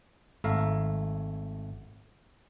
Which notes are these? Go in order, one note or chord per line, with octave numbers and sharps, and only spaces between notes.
G#1 A3 E5 F5 A#5